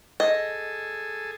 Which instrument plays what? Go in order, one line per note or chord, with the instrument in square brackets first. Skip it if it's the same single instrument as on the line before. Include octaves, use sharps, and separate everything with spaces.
[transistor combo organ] G#4 A4 [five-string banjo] D#5